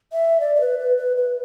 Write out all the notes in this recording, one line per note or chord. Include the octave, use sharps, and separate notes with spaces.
E5
D5
D5
B4
B4
B4
B4